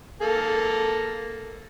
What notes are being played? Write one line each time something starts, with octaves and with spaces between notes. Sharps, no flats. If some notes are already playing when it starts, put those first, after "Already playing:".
A#3 A4